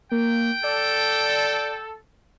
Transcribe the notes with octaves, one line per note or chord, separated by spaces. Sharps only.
A#3 G5
A4 D5